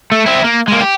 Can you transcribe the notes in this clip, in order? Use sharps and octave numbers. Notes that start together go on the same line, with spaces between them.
A3
C4 E4
A#3
G#3 A#3
G4